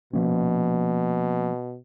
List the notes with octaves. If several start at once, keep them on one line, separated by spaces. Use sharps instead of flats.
B2 F3 A#3 C#4